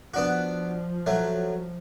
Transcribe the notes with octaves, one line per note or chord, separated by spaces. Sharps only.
F3 B3 D4 F#4
F#3 A3